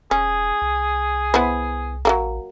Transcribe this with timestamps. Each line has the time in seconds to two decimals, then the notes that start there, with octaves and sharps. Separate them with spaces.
0.11 E1 C#4 G#4
0.62 C2
1.34 B3 E4 C5
2.05 A1 F#3 A3 A#3